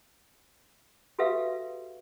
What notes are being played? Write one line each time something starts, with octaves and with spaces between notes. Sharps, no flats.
F#4 G4 A4 B4 E5 F5